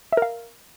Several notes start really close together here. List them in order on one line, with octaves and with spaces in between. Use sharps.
E5 A#4 F5